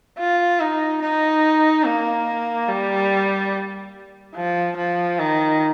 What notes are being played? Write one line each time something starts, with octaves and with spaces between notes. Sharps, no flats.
F4
D#4
D#4
A#3
G3
F3
F3
D#3